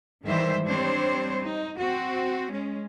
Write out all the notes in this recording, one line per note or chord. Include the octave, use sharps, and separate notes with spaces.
G#2 D#3 E3 G3 C5 E5
G3 C4 D4 C5 C#5
D#4
C4 F#4
G#3 C#4